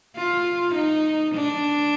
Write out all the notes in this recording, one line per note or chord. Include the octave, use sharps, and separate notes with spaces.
F4
D#4
D4